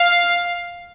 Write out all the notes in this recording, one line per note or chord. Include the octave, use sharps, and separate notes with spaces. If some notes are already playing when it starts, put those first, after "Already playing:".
Already playing: F5